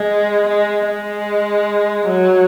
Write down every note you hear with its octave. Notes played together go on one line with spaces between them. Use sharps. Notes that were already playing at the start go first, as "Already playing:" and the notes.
Already playing: G#3
G#3
G#3
F#3